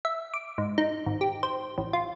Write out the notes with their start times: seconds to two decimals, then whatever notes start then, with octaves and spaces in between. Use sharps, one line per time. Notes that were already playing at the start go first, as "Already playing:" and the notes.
0.05 E5
0.34 D6
0.58 G#2
0.78 D#4
1.06 G#1
1.21 G4
1.43 C5
1.78 A1
1.93 F4